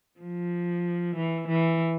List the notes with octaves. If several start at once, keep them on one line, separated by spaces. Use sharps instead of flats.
F3
E3
E3